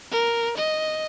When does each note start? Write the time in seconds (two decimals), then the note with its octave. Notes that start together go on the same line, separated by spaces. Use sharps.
0.11 A#4
0.57 D#5